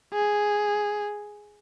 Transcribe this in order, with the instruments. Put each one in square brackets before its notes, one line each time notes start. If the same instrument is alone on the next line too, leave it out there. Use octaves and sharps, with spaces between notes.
[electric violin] G#4